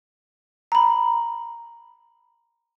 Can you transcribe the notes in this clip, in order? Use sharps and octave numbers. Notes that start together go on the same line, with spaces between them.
A#5 B5